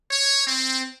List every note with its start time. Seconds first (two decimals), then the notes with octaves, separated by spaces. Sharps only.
0.11 C#5
0.47 C4